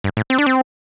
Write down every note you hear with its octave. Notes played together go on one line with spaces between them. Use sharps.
G2
A2
C4
D4
C4